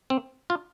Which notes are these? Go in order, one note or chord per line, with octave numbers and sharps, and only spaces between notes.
C4
F4